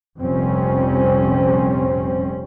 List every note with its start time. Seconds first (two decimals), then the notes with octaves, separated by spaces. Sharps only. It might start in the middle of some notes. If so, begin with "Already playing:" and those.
0.21 F1 A#1 F2 G3 C4 C#4